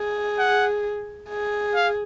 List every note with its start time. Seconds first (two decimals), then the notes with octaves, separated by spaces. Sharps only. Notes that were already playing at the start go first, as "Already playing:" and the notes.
Already playing: G#4
0.38 F#5
1.29 G#4
1.75 F5